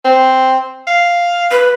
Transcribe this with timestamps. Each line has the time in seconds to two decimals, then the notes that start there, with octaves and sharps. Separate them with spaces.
0.05 C4
0.87 F5
1.51 B4